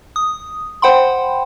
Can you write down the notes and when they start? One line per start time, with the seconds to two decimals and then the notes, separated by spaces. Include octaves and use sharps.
0.16 D#6
0.82 C5 F#5 G5 B5 C6